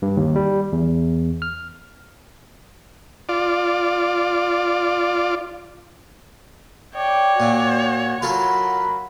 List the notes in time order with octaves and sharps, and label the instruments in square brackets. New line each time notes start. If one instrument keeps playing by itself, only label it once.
[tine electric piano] G2
D#2
G3
E2
F6
[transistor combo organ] F4 D5
[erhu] C#5 [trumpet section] D5 [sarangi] G5
[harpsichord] A#2 [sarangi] F#4
[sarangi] F#3 [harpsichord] F4 A4 [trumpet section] A#4 B5